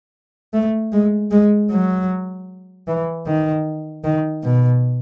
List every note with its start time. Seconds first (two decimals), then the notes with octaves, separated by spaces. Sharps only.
0.54 A3
0.92 G#3
1.31 G#3
1.71 F#3
2.88 E3
3.26 D#3
4.04 D#3
4.43 B2